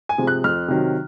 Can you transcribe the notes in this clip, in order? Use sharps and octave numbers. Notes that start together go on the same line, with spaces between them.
G#5
C3 F3 G#3
F#6
F2 F6
C3 D#3 F#3